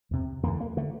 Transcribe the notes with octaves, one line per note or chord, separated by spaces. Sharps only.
E2 C3
E2 D3 A#3
A#3
D3 A3